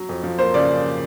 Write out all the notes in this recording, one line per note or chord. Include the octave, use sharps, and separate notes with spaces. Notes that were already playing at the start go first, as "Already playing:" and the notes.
Already playing: F#3
F2
F3
A#3 C5
C#3 D5